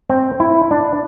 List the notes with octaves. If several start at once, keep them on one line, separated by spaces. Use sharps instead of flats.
C4
E4
D4